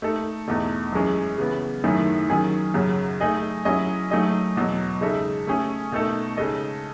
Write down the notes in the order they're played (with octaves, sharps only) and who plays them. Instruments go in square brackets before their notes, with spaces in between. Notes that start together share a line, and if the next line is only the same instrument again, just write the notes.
[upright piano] A3 D#4 A4
E2 B2 A3 D#4
F#2 E3 G#3 C#4
C#3 E3 B3
F#2 D#3 A3 E4 G#4
D#3 F#3 C#4 G#4
F#2 C#3 F#3
A3 D#4 G#4 D#5
F#3 C#4 E4 G#4 D#5
F#3 A3 D#4 G#4 D#5
E2 B2 F#3
C#3 G#3 D#4 A4 E5
A3 C#4 G#4
B2 A3 D#4 A4
C#3 G#3 D#4 A4 D#5